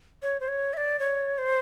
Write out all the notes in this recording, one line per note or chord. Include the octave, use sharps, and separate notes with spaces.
C#5
C5
C#5
E5
D5
C#5
C5